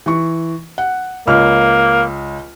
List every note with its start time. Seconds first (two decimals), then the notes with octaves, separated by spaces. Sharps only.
0.06 E3 C#6
0.78 F#5
1.27 C#2 A#3 C#5 F6